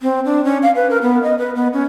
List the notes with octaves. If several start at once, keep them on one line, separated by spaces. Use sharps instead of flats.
C4
D4
C#4
F5
B4
A#4
B3
D#5
B4
B3
C#4